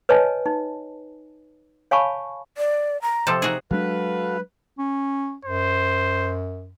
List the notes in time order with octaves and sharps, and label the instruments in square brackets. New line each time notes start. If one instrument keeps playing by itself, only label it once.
[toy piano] B4 C#5 D#5 G#5 A5
D#4
C#5 F5 G#5 A5 B5 C#6
[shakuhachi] D5
A#5
[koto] C3 F3 A4
[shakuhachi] D#4 [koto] F#4 G#4
[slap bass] F#3 G#3 D4 [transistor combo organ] F#4 A4 F5 [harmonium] B4
[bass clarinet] C#4
[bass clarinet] F#2 [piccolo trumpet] C5